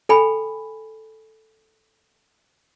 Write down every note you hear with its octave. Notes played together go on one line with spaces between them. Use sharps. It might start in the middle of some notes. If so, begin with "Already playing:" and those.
A4 G5 G#5 B5